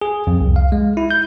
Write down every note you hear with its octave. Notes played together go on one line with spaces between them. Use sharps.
G#4
F2
C2
F5
G#3
E4
G6